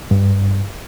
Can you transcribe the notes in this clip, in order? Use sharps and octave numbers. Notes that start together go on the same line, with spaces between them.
G2